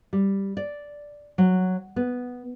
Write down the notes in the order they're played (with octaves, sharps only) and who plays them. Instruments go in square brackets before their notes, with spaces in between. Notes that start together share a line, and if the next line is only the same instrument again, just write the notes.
[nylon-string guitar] G3
D5
F#3
B3